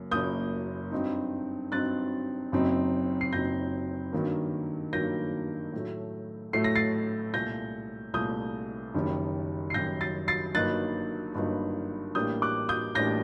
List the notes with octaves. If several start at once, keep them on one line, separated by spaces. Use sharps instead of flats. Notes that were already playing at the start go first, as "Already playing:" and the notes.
Already playing: F#1 F#2 F#3 A#3
F#1 F#2 F#3 A#3 D#6 G6
G2 F#3 C4 D#4
G2 F#3 C4 D#4 F#6 A6
F#1 F#2 F#3 C4 D#4
C7
F#1 F#2 F#3 C4 D#4 G6 A#6
G2 D#3 F#3 A#3
G2 D#3 F#3 A#3 G6 A#6
A2 F#3 A3
A2 F#3 A3 C7
A#6
A6 C7
C2 A#2 A3 G6 A#6
C2 A#2 A3 D#6 G6
F#1 F#2 D#3 G3
C7
F#1 F#2 D#3 G3 G6 A#6
A6 C7
A6 C7
G1 G2 F#3 A#3 D#4 F#6 A6
G1 G2 F#3 A#3 D#4
A1 A2 G3 A#3 D4 D#6 G6
D6 F#6
D#6 G6
A1 A2 G3 A#3 D4 G6 A#6